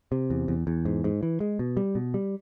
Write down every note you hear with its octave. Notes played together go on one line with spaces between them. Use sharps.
C3
E2
E2
E2
G#2
G#2
E3
G#3
B2
G3
B2
G3